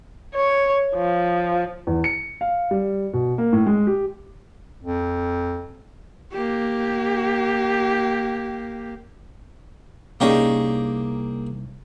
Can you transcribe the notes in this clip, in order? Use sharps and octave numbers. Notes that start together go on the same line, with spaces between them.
C#5
F3
E2
C#7
F5
G3
B2
A#3
A2
G#3
G4
F2
A#3 G4
C2 A#3 C#4 D#4 G4 G#4